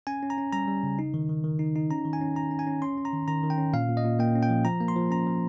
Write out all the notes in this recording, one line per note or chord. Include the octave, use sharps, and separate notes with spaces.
C#4 G#5
C#4
A#5
C#4
G3 A#5
G3
C#3
D#4
D#3
D#3
D#3
D#4
D#4
C#4 A#5
D#3
G#5
C#4
C#4 A#5
C#4
G#5
C#4
C#4 C6
C#4
A#5
D#3
D#3 A#5
D#3
G5
C#4
A#2 F5
A#2
D#5
A#2
A#3 G5
C#4
G5
F3
F3 A#5
A#3
C6
F3
C#4 A#5
F3